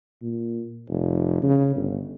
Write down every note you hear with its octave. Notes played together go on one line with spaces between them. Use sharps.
A#2
F1
C#3
G1